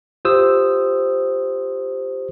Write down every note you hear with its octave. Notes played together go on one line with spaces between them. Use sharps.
F4 G4 C5 D#6 E6